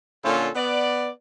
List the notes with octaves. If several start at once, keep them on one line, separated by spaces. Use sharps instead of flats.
A#2 D3 C#4 F4 A4
B3 D5